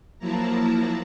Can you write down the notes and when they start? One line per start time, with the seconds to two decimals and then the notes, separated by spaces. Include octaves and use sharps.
0.19 F3 F#3 A#3 E4 A5 A#5